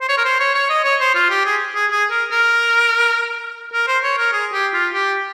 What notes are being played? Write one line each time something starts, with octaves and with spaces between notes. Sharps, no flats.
C5
C#5
A#4
C5
C#5
C#5
D#5
C#5
C5
F4
G4
G#4
G#4
G#4
A#4
A#4
A#4
C5
C#5
A#4
G#4
G4
F4
G4